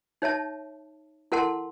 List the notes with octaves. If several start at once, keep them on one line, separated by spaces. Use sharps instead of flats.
D#4 C#5 E5 A5
E4 A4 A#4 F#5 A5 C6